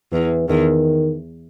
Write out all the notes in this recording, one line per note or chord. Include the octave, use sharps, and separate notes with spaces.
E2 E3
E2 D#3